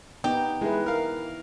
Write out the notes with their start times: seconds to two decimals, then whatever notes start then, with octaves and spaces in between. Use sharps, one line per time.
0.24 B3 D#4 G4
0.61 G#3 E4 B4
0.86 A#4 F5